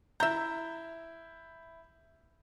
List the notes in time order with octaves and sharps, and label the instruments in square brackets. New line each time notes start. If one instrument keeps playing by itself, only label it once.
[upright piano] E4 G6 [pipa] E5 A#5